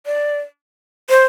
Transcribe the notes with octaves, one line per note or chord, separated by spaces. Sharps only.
D5
C5